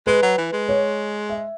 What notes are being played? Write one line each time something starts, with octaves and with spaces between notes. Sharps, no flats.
G#3 B4
F#3
E3
G#3
C#5
E5